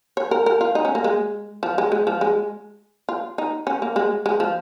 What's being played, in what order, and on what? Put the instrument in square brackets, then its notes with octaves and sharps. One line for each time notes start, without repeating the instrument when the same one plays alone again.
[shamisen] C#5
A#4
A#4
F4
D#4
C#4
A#3
G#3
F3
G#3
G#3
F3
G#3
F4
D#4
C#4
A#3
G#3
G#3
F3